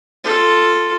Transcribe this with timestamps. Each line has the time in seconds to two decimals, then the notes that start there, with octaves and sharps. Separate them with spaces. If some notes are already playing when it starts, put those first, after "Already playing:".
0.24 F4 A4